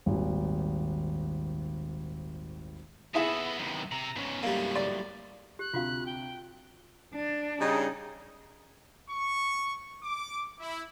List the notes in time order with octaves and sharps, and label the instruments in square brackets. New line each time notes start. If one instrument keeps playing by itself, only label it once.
[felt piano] D#1 G#1
[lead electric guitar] B3 [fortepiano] E4 G#4 E5 [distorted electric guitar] F#4 A4
[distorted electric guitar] F#2 C3 [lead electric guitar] D#3 B3
[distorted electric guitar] C3 [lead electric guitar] A#5
[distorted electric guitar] G#2 C#3 [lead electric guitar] B3 C#4
[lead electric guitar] A2 F#3 [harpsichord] G3 A#3
[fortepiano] D5
[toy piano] G4 [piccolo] F#6
[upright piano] D2 C3 [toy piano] F4 F#4 F5
[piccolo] G5
[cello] D4
[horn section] C#3 G3 D#4
[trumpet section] C#6
D6
E4